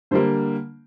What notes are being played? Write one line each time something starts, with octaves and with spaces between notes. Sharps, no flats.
D3 G3 A#3 C5